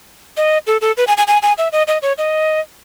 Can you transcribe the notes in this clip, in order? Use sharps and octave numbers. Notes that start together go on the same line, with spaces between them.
D#5
A4
A4
B4
G#5
G#5
G#5
G#5
E5
D#5
D#5
C#5
D#5